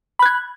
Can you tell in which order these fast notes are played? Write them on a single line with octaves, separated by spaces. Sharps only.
B5 F#6 G#6